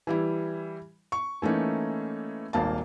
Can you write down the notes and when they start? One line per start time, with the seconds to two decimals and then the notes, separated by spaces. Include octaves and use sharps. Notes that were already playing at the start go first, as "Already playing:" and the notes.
0.07 E3 G3 E4
1.12 C#6
1.42 E3 A3 A#3 C#4 D#4
2.53 D#1 G#1 A#3 F5 A5